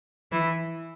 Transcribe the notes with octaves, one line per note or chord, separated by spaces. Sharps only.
E3 E4